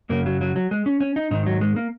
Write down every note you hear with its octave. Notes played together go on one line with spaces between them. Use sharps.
F#2 C#3 A#3
F#3
F#3
F#3
G#3
C#4
C#4
D#4
G#2 D#3 D#4
F#3
G#3
A#3